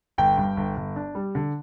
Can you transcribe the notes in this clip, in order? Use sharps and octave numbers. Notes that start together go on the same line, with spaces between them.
G1 G5
G2
G1
G1
D4
G3
D3